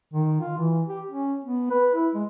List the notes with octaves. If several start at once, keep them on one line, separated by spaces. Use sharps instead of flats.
D#3
F4
E3
G4
C#4
B3
B4
E4
G#3